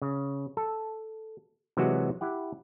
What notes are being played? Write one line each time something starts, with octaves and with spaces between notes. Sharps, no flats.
C#3
A4
C3 E3 F#3 G#3 F#4
E4 G4 F#5